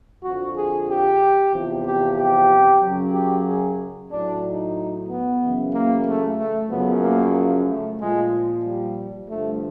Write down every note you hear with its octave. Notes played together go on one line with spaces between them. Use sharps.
F2 D3 F3 F#4
G#4
G4
E2 C3 F3
G4
G4
F#2 C#3 F#3
G4
G#4
A2 F#3 D4
D#4
B3
F#2 C#3 E3
A#3
A3
A3
F#2 C#3 F3 B3
A#3
A3
A#2 F3 G#3
G3
G2 D3 F3 A3